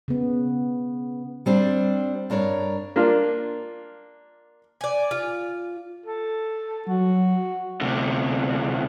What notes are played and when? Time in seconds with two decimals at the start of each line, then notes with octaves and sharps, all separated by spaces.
0.08 C#3 B3
1.46 G3 C4 D4
2.30 G2 D4 A#4 C#5
2.96 A#3 D4 F4
4.81 D5 G#5
5.11 F4
6.06 A4
6.88 F#3 F#4
7.81 D2 C3